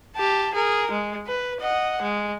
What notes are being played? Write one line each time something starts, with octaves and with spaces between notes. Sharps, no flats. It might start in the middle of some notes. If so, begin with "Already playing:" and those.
G4 A5
G#4 A#4
G#3
B4
D#5 F#5
G#3